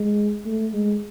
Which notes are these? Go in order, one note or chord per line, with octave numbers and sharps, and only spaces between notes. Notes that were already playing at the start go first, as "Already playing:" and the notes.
Already playing: G#3
A3
G#3